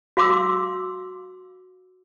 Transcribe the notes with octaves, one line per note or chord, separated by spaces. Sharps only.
F#4 F5 C6 D6 E6